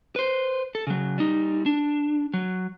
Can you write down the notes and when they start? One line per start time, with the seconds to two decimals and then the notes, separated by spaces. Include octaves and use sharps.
0.16 B4 C5
0.75 A4
0.87 C#3 F#3
1.18 G3 D#4
1.66 D4
2.34 F#3